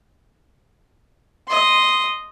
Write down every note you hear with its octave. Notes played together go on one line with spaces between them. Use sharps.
D#5 C6